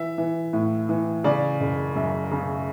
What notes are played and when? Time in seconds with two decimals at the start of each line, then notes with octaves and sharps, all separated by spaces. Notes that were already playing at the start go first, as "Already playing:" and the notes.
Already playing: E3 E5
0.18 E3
0.53 A2
0.89 E3
1.24 C#3 D5
1.60 F#1
1.96 F#2
2.31 C#3